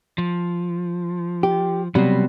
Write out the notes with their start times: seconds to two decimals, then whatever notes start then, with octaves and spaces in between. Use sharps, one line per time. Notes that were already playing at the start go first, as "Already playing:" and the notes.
0.18 F3
1.43 G4
1.95 C3 F#3 G3 B3 F#4